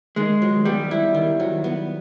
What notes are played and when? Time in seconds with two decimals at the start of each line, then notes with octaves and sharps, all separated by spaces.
0.16 D#3 G#3
0.42 F#3
0.65 G3 B3
0.91 E4
1.15 D#3
1.40 F#3
1.64 B3